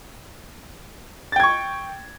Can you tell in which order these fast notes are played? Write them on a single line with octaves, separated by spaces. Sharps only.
A6 G5 G#6 C#6